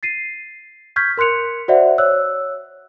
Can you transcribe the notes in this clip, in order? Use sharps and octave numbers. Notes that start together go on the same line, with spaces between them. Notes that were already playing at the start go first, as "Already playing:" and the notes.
A6 C7 D#7
C#6 F6 G6 G#6 B6
A#4 C6 F#6 C#7 F7
F#4 C5 D5 E5 F#5
C#5 E6 F#6